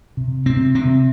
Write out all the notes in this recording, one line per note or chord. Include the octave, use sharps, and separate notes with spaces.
C3
C3 C4
C3 C4